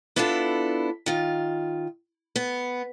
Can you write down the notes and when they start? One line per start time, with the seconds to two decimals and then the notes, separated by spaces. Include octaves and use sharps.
0.16 B3 D4 E4 F4 G#4 A4
1.06 D#3 F4
2.36 B3